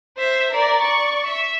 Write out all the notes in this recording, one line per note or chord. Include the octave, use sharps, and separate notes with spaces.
C5 E5
A#4 D5
D5 C#6
E5